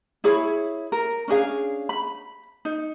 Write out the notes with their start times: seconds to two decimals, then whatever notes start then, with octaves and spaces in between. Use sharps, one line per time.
0.24 E4 G#4 C#5 B5
0.92 A#4
1.28 C#4 D4 G#4 F5
1.89 B5
2.65 D#4